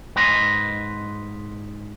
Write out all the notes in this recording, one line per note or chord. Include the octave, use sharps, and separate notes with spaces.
G#2 B4 D#5 C6